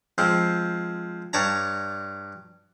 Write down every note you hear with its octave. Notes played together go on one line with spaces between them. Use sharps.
F3 G#3 C4
G2 C#5 D5 A5 A#5